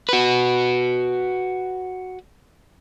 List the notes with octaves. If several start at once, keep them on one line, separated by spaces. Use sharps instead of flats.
F#4 B4